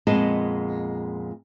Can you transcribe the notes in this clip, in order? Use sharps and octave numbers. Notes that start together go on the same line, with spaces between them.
F2 A#2 G#3 B3 D#5 A5